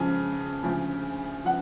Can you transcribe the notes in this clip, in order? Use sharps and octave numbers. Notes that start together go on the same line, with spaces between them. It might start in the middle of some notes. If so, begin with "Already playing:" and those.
Already playing: F2 C#3 F3 G#5
D2 C#3 F3
F3 F#5